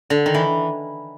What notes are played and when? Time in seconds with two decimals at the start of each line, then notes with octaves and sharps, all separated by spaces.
0.10 D3
0.26 D#3
0.34 E3